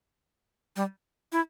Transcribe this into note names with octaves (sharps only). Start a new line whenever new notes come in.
G3
E4